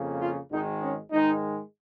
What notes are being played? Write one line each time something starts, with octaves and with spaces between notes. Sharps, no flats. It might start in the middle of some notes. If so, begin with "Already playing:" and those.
Already playing: F2 C#3 A#3
F4
G#1 G#2 D#3 G#3 D#4
C#4
G#2 D#3 G#3 D#4